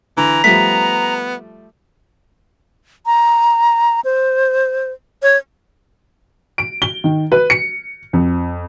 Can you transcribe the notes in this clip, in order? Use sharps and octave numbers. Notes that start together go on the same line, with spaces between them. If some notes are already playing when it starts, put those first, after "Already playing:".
D3 E3 A#5
F3 G3 A3 B3 B6
A#5
C5
C#5
D7
G7
D#3
B4
C#7
F2